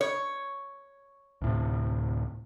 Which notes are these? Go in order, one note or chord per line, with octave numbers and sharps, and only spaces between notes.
C#5
D2 A2 C3